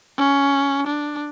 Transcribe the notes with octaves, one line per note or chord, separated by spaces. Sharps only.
C#4
D4